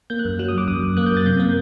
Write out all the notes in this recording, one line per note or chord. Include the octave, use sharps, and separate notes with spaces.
A#3 G6
F#6
F#2
F#3 F#6
D#6
F#2 D6
F#2 D#6
F#2
A#3 F#6
G6
F#2
A6
C3 G6
A#3